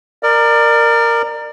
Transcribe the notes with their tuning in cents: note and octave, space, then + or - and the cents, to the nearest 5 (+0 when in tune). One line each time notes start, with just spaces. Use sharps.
A#4 -5 D5 +25